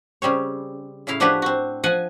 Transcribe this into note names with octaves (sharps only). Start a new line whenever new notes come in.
C#3 G3 C4 C#5
A2 C#3 E4 F5
F3 D4 F#4 G4 B4 C#5
C4 F#4
F3 F#5 G#5